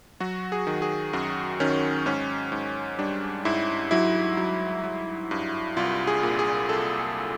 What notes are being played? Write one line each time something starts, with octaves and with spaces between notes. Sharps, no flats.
F#3 F#4
G#4
D#3
G#4
F#2 F#4
D#3 C#4
G#2 C#4
G#2
G3 D4
G#2 E4
F#3 E4
F#3
F#3
G2
C2 F4
G#4
A#2
G#4
C2 A4